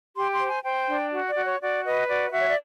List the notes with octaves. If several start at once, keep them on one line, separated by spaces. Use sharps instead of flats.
G4 C6
C6
C5
G#5
C5 G5
D4
F#4
D5
F#4
C#5
F#4 D5
B4 D#5
F#4 D5
D#5
F#4 E5
C#5
D5